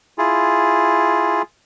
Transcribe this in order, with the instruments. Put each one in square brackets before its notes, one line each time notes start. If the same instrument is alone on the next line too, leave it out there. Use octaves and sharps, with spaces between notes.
[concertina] E4 F4 G#4